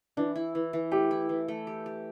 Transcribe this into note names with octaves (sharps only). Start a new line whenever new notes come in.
E3 D4
E4
E3
E3
A3 G4
E4
E3
A3
G4
G4